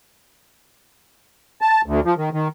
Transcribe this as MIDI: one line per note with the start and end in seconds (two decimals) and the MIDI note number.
1.61 1.81 81
1.86 2.00 38
2.05 2.14 53
2.17 2.29 51
2.33 2.48 51